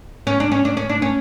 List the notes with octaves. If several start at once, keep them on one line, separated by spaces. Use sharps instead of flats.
C#4
D4
C#4
D4
C#4
D4
C#4